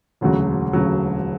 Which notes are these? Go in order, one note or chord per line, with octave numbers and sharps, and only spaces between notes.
E1 D2 C#3 F#3
E1 D2 C#3 F#3